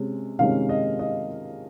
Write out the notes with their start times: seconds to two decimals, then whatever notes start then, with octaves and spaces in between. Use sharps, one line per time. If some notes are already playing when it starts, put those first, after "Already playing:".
Already playing: C3 G#3 C#4
0.39 C3 D#3 G#3 C#4 F5
0.69 D#5
0.99 D#5